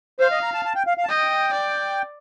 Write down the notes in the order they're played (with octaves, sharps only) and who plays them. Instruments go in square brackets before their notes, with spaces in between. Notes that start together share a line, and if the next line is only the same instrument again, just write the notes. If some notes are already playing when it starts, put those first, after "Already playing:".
[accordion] C5 [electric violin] F5
[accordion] D#5
A#5
A5
A5
G5
F5
F5
A5
[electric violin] D#5 [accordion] G5
[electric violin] D5